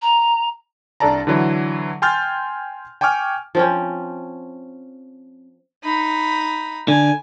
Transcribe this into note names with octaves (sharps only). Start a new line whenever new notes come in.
A#5
C2 D4 A4 D5 A5 A#5
D3 E3 F#3 E4
G5 G#5 C6 F6 G6 A6
G5 G#5 C#6 D6 F6
F3 C4 C#4
D#4 B5
D3 G#5